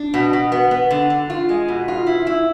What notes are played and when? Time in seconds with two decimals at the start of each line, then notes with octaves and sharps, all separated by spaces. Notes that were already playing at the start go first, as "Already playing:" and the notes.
Already playing: D4
0.14 B2
0.33 B2
0.52 B3
0.71 B3
0.91 D3
1.10 D3
1.30 F4
1.49 G#3
1.68 B2
1.88 F4
2.07 E4
2.27 E4